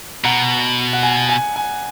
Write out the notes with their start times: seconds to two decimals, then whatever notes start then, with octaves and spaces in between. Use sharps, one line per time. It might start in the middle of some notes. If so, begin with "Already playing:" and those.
0.24 B2 F#5 A#5
0.93 F#5
1.03 G#5
1.29 G#5
1.56 G#5